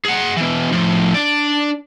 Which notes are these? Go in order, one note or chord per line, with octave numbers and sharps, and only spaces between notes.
G#4 F#5
B2 E3
A2 F3
D4 D5